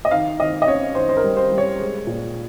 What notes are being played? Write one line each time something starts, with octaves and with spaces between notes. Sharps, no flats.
D#5
D#3 F5
D#3 D#5
D#5
C#4 C#5
D#3 C5
C5
A#4
G3
C5
G3
C#5
G#3
A#2